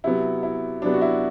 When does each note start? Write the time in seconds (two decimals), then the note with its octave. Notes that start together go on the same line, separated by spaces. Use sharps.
0.04 C3 F#3 B3 E4
0.43 E4
0.82 C3 F#3 B3 D4
0.94 F#4
1.02 E4